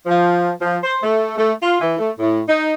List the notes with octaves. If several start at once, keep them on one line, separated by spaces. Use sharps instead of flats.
F3
F3
C5
A3
A3
F4
E3
A3
A2
D#4